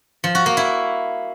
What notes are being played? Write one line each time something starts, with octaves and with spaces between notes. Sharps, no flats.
F3
F#4
A#3
E4